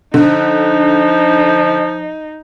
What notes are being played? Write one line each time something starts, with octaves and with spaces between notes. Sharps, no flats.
D3 F3 D#4